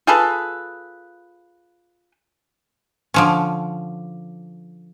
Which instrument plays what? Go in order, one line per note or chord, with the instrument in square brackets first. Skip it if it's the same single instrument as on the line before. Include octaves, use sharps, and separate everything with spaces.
[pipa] F4 G#4 A4 B4
[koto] D3 F3 C#4